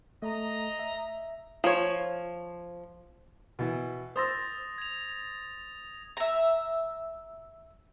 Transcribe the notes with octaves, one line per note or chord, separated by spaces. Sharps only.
A3 D#5 A#5
E5
F3 C#5
B2 E3
C5 C6 D#6 E6 A6 A#6
G#6 F7
E5 A#5